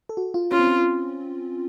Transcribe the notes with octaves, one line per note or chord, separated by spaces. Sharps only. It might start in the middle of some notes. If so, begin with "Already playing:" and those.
A4
F#4
F4
C#4 F4
C4
C#4